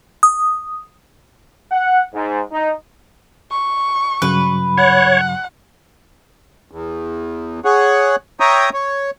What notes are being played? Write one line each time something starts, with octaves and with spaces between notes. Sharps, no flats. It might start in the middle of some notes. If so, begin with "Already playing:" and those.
D#6
F#5
G#2
D#4
C#6
G2 C#3 F#3 B4
C#5 F#5
E2
G#4 C#5 F#5
C#5 E5 G5 A#5 D#6
C#5